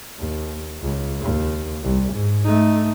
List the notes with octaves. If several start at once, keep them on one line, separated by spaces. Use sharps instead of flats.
D#2
C#2
D#2
C2
G#2
A3 D#4